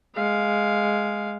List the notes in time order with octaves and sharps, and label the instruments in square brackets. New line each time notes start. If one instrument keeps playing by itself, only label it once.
[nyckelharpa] G#3 F5